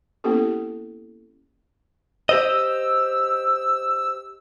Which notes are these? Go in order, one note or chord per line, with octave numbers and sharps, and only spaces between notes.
A#3 B3 C#4 E4 G4 A4
G4 C5 D#5 E6